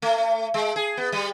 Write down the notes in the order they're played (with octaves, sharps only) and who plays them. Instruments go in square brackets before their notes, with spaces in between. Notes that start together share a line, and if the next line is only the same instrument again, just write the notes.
[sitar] A3
G#3
G#4
B3
G3